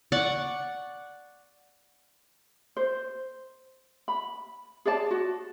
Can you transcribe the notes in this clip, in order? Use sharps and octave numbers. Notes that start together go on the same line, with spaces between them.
D5 F#5 C#6
C5
B5
G#4 C#5 D5 A5
F#4